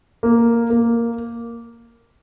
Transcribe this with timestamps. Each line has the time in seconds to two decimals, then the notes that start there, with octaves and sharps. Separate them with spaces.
0.23 A#3
0.70 A#3